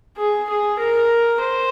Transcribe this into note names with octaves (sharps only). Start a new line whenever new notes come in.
G#4
G#4
A#4
C5